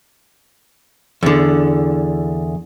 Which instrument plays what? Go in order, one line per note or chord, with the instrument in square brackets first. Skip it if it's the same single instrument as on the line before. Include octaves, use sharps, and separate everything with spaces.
[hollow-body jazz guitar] E2 D3